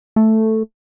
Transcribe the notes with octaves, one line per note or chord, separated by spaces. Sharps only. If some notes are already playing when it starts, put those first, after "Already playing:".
A3